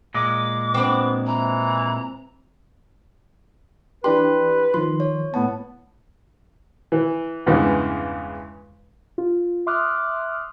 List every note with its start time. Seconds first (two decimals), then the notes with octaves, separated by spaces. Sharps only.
0.14 A#2 G#3 D6
0.74 B3 C4 D4
1.26 E3 A#5
4.04 E3 D4 G4 B4 C6
4.74 D#3 F3 C6
5.00 C#5
5.34 A2 B3 C#5 A5
6.92 E3
7.46 E2 G2 C#3 E3 G#3
9.18 F4
9.67 E5 C6 D6 D#6 F6 F#6